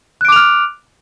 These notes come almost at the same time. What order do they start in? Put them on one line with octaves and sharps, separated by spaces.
F#6 D7 D6 F7 F6